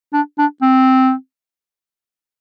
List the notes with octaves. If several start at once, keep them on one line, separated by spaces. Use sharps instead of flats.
D4
D4
C4